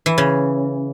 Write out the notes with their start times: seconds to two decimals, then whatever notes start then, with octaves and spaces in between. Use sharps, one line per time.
0.06 E3
0.18 C#3